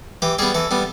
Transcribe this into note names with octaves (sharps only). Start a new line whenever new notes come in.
E3 G4
G3 B3 G#4
E3 A4
G3 B3